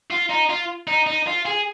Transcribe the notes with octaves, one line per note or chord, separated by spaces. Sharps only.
F4
D#4
F4
D#4
D#4
F4
G#4